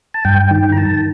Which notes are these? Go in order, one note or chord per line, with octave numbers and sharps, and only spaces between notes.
A5
G2 G5
D#3
A#5
D#3 A5